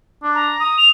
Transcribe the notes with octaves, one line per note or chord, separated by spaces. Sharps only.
D4
A#5
D#6
F7